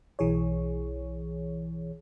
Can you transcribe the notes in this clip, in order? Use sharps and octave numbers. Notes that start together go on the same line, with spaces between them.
B1 E3 G#4 C#5